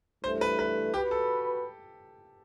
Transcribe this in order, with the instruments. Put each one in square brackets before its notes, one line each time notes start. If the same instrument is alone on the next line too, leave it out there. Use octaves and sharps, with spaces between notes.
[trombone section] G2 E3 A3 [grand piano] C5
[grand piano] B4
B4
[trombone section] F#4 B4 [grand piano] G4
[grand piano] A4